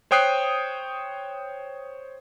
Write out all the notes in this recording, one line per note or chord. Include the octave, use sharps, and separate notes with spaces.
C5 C#5 G5 D#6 F#6 C7